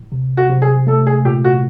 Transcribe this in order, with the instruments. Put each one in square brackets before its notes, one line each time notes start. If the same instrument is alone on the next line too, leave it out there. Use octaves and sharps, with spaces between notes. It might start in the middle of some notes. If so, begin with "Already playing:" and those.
Already playing: [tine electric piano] A2
C3
[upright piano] F#4
[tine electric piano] C3
[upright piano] G#4
[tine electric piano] A3 [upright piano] A4
[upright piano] G#4
[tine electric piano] A#2 [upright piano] G4
[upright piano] F#4